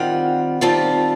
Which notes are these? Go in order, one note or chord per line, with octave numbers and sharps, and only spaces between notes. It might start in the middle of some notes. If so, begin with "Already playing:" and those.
Already playing: D#3 G3 C4 F4 F#5
D#3 G3 C4 F4 A5